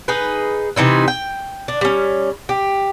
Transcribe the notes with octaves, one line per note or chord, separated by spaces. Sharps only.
D#4 G#4 B4
C3 E3 D#4 E4
G5
D4
G3 C#4
G4